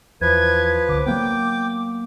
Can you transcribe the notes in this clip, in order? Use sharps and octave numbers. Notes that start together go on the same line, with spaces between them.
E2 F3 B4 G#6
C#2 D3 D6
F#3 A#3 B3 G5